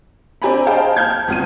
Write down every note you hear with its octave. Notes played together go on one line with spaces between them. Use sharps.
C4 D4 G4 G#5 A#5 B5
G#4 C5 D#5 F5 G5 A5
A5 F6 G6 G#6
G1 C#2 D#7